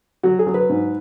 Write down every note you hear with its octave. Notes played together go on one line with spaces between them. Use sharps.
F#3 F#4
G#4
F#3
B4
G#2